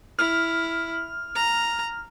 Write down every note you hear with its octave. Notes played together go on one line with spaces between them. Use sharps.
E4 F6
A#5